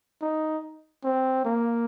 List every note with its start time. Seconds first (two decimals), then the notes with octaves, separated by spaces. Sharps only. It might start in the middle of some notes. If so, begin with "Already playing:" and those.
0.22 D#4
1.04 C4
1.45 A#3